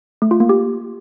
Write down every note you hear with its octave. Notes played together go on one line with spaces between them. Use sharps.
A3
F4
A#3
G4